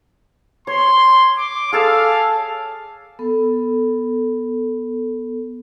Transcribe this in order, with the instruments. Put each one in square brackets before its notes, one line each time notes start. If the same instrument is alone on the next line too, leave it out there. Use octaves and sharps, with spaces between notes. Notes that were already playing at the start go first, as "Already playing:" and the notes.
[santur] C#5 [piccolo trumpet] C6
[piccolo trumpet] D6
[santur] G#4 A4 A5 [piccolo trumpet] F5
[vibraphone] B3 A4